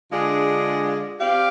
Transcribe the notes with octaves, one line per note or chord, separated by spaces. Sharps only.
D3 G#3 D4 F4 G#4
C4 G4 D5 F5